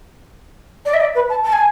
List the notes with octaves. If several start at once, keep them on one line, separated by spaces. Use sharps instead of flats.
D5
E5
D5
B4
A5
A5
G#5